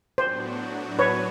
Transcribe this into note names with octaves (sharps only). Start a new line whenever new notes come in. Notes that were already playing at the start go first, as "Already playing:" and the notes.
A2 F#3 B3 D4 F#4 C5
B4 C#5